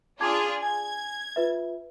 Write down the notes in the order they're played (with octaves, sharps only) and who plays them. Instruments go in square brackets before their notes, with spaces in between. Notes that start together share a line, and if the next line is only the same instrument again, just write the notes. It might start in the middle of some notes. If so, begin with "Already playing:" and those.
[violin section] D4 F4 G#4 [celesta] A5 D6 G#6
[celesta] G#5 [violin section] G#6
[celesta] F4 B4 E5